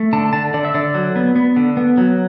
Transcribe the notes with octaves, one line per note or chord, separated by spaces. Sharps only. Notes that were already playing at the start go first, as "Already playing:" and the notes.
Already playing: A3
D3 A5
D3 A5
D3 D5
E5
D3 D5
F#3
B3
B3
D3
B3
F#3